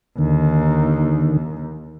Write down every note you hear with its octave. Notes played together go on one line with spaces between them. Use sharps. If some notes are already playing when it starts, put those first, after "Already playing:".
D#2 D3 D#3